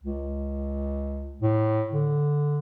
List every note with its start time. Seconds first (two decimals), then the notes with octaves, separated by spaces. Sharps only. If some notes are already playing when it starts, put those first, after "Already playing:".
0.03 C#2
1.41 A2
1.93 D3